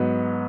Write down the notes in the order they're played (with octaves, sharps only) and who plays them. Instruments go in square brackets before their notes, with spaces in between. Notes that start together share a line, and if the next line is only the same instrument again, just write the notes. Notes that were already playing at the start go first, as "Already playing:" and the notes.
Already playing: [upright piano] G#2 F#3 B3